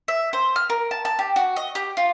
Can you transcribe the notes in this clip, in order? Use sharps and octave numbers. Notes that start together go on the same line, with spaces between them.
E5
C5
F6
A#4
A5
A5
G4
F#4
D#5
G4
F4